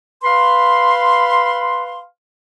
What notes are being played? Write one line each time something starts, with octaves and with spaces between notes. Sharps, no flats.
B4 F5 B5 C6